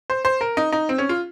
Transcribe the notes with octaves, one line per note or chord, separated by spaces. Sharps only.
C5
C5
A#4
D#4
D#4
C4
C#4
F4